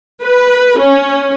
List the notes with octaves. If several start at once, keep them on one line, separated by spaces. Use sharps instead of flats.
B4
C#4